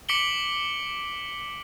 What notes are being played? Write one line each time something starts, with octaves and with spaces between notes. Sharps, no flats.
D6 B6 C#7 D7 F#7 G7